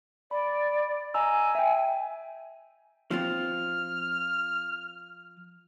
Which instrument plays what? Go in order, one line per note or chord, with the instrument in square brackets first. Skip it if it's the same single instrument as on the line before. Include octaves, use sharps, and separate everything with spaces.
[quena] D5 [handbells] B5
[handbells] D#5 A#5 E6 [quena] G#5
[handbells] E5 G5
[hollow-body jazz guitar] F3 C4 F4 [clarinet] F6